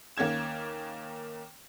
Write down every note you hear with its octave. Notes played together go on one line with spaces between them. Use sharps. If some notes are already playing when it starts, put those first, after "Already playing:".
D#2 A#3 C#4 G#6 E7